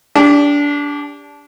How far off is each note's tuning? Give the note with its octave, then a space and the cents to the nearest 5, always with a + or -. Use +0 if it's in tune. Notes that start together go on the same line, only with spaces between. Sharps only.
D4 -20 G4 +25